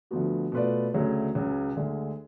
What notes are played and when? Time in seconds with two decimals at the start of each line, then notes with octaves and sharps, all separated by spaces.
0.11 D2 D3 F3 B3 F#4
0.52 B2 A3 F4 B4 D5
0.94 D2 C#3 F#3 A3 D4
1.35 C#2 C#3 F#3
1.76 D2 D3 G#3